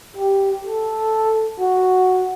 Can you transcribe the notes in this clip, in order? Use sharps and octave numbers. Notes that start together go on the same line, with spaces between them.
G4
A4
F#4